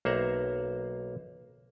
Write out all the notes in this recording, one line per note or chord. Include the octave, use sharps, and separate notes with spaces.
B1 A#3 C5 E5 F#5 A#5